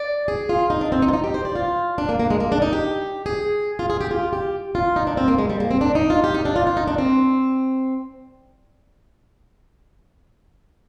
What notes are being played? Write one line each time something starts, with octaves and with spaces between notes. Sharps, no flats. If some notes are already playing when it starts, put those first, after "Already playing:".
Already playing: D5
G#4
F4
D#4
D4
C4
D#4
F4
D#4
G4
C5
D5
F4
D4
A#3
A#3
G#3
A#3
D4
D#4
G4
G#4
F4
G#4
G4
F4
G4
F4
D#4
D4
C4
A#3
G#3
G3
A#3
C4
D4
D#4
F4
G4
D#4
D4
F4
F4
D#4
D4
C4